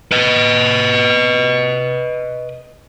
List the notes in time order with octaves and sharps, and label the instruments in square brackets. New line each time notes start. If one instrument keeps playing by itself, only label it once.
[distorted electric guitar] B4 D#5